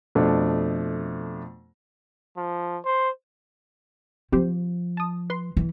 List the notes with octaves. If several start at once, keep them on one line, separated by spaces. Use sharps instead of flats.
F2 B2 A3 D4
F3
C5
F3 C4 G4 C5
A5 D#6
B4 C6
E3